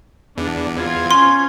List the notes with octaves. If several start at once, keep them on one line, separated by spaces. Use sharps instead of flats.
E2 D4
C4 F4 G#6
C#4 C6